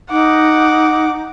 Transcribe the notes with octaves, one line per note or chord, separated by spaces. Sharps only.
D#4 F#5 D6